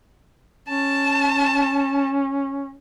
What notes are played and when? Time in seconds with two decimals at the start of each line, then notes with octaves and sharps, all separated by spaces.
0.69 C#4 A5